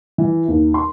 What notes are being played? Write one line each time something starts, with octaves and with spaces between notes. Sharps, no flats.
E3
D#2
C6